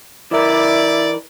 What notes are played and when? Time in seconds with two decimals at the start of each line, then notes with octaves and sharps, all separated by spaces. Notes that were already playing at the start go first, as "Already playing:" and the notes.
0.31 E3 E4 A#4 D5